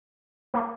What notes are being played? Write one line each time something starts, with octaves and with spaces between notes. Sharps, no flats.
A#3